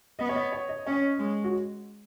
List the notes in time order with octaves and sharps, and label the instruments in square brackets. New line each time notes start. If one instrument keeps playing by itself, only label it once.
[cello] B3 [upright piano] D#5
[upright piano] C#5
D#5
C#5
D#5
[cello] C#4 [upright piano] C#5
[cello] G#3
[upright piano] F#4